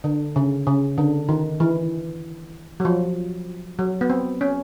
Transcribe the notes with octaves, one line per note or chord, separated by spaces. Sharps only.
D3
C#3
C#3
D3
D#3
E3
F#3
F3
F#3
B3
C4
C#4